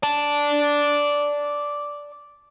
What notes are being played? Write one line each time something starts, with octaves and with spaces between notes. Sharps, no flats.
D5 A5